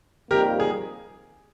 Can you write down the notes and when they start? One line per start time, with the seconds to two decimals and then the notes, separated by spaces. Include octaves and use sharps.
0.31 F2 D#3 G3 A#3 G4 A#4
0.60 G#4